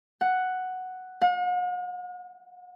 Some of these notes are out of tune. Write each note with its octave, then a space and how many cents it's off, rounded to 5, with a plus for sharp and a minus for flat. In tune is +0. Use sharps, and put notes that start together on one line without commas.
F#5 +0
F#5 -45